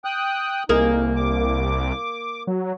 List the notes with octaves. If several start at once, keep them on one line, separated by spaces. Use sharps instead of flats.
G5 D#6 F#6
C2 A#3 D#4 G#4
D6
F#3